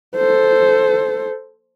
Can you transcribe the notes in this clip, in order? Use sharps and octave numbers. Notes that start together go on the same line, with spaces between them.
A4 C5